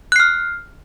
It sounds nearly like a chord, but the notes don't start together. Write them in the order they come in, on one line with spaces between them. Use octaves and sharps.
F#6 C7 F6